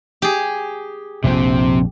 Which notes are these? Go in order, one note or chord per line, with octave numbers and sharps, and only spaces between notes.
G4 G#4
A#1 F2 C3 C4